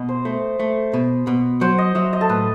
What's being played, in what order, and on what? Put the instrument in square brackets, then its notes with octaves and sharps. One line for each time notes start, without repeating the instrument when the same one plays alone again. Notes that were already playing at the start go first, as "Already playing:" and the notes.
Already playing: [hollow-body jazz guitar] B2 [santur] D#5
[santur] C5
[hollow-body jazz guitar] A3 [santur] C5
[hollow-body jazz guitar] A3
B2
B2
[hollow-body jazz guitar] F#3 [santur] C5
[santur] D#5
[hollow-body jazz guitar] F#3 [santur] E5
[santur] D#5
A4
[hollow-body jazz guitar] A2 [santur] B4